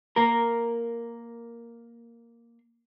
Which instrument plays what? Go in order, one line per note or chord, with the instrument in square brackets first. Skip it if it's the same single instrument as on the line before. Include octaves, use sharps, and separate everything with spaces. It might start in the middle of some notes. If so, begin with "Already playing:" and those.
[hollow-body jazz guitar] A#3 A#4